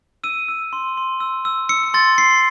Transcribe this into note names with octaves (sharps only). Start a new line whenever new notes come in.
E6 D#7
E6
C6
C6
E6
E6
E6 C#7
C6 A6
C6 C7